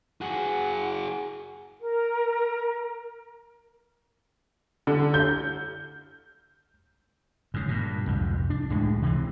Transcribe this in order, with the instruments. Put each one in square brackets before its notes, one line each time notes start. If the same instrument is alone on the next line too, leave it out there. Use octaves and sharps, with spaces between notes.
[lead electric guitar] F#4 G#4 [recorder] F#5
[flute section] A#4
[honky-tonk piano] D3
G6
[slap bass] G#2 C#3
G2 A#2
C2 F2 G#2
D4
C#2 A2 G#3
C3 E3 C4